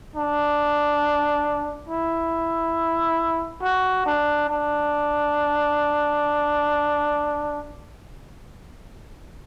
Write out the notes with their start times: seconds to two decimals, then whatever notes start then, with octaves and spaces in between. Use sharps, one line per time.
0.15 D4
1.89 E4
3.62 F#4
4.06 D4
4.48 D4